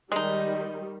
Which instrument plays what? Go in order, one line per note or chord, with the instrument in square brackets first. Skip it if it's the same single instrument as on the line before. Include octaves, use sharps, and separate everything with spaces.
[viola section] D#3 G3 [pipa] G#3 D#4